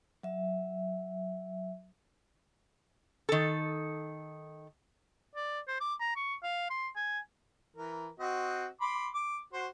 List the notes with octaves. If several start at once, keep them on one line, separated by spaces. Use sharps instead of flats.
F#3 E5
D#3 A4
D5
C5
D6
A#5
C#6
F5
C6
G#5
E3 A#4
C4 F#4 D#5
B5 C6 D6
D6
F#4 C5